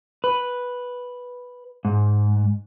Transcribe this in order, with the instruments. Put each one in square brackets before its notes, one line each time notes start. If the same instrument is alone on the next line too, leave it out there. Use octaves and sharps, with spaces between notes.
[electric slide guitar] B4
G#2